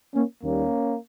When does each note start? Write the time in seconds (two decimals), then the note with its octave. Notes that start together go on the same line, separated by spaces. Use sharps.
0.14 A#3 C#4
0.42 D#2 D#3 G3 A#3 C#4